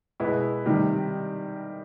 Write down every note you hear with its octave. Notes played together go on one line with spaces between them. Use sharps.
B2 G#3 B3 E4
C3 D#3 G3